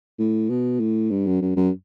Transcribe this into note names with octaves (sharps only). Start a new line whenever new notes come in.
A2
B2
A2
G2
F#2
F#2
F#2